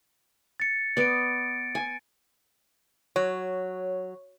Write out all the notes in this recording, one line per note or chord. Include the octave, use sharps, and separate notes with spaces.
A6 C#7
B3 D5 A6 D7
G#5
F#3 C#5